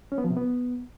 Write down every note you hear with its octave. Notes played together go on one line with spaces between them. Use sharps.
C#4
B3
F3
C3
B3